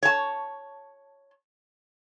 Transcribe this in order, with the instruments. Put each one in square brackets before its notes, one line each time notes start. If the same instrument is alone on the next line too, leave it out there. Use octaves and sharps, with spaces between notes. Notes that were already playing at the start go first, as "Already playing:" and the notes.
[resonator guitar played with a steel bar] C#5 A5